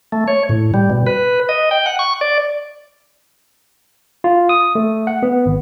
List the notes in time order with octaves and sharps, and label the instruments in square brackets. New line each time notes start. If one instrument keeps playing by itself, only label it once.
[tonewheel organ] A3
C#5
A2
G3
B2
B4
D#5
G5
F#5
C#6
D5
[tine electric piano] F4
D#6
A3
F#5
B3
G#1